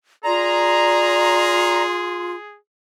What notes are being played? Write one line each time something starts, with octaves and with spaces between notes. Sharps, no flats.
F4 G#4 D5 A#5 C6